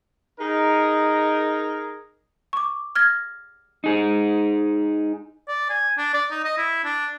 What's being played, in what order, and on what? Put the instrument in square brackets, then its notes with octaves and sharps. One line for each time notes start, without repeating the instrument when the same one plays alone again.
[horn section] D#4 G#4 A#4
[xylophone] C#6 D6
F6 G#6 A#6
[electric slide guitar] D#4 G#4
[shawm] D5
G#5
D4
D5
D#4
D#5
E4
D4